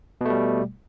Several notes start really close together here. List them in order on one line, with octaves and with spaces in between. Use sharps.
B2 A3 G3